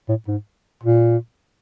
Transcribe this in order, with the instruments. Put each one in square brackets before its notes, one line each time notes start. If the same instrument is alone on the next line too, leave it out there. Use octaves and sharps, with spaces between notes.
[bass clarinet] A2
G#2
A#2